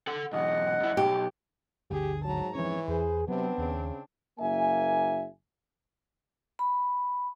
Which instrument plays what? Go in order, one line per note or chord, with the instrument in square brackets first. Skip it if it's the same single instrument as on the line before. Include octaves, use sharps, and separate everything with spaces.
[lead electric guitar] A4 F#5
[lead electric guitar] B1 E2 [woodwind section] D#5 F#5
[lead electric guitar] F#2 E4
[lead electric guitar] B1 [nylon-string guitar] G4
[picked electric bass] G1 D2 D3 [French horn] G4 [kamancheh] G#4
[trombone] G#2 [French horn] F#3 [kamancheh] A5 A#5
[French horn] E3 [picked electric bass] F3 C4 C#4 [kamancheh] C#5
[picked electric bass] E2 [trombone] G#4 [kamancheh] B4 C5
[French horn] C3 [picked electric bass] F#3 [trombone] B3 [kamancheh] C4 D4
[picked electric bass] D#2 [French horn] C#3
[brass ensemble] F#1 A#3 E5 G#5
[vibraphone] B5